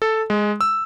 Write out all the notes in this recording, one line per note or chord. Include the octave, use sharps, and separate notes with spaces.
A4
G#3
E6